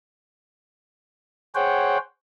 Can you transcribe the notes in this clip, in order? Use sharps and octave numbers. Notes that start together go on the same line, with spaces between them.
G#4 C5 C#5 F#5 G5